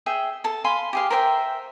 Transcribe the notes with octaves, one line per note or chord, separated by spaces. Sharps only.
G#4 E5 G5
A4 A5
F5 G#5 B5 C6
G4 G#4 F5
A#4 C5 E5 G5